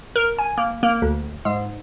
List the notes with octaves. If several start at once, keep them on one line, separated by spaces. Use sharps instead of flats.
A#4
G#5
A#3
A#3
D2
G#2